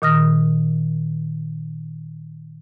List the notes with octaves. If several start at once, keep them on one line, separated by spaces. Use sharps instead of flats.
A#2 D#3 D#6 F6 A#6